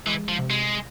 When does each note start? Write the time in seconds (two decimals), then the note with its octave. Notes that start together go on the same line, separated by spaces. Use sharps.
0.07 E3 G#3
0.29 F3
0.39 C3
0.50 G#3